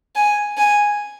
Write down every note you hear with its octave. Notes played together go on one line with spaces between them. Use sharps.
G#5
G#5